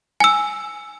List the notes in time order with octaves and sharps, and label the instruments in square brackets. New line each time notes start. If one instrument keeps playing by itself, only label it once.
[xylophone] G#5 E6